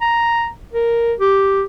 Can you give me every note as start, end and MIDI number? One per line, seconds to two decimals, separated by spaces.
0.01 0.48 82
0.73 1.13 70
1.20 1.64 67